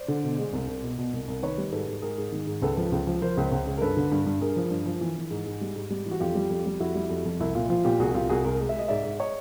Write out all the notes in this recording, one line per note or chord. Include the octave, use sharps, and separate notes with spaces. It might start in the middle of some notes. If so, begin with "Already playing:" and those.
Already playing: C5 D5
D3
B2
G#3
C2
C2
B2
B2
C2
C2
D#3 B4 C#5
G3
G#2 A4 B4
G#2
G#2 G#4 A#4
G#2
D#3
G#2
C#2 A4 B4
F3
C#2
F3
F3 A#4 C5
C#2
C#2
C#3
A#4
G2 A4 B4
D3
G2
G2
G2 G#4 A#4
F3
G2
F3
E3
E3
G#2
G#2
G3
G#2
G3
E3
F#4
F2 F4 G4
G3
F2
G3
F2 E4 F#4
G3
F2
F2
C2 E4
A#2 F4
F3 F4
A#2 F4 G4
C2 F#4 G#4
C2 F4 G4
C2 F#4 G#4
C2 G#4 A#4
G#3
E5
G#3 D#5
G#2 D5 E5
G#2
C#5 D#5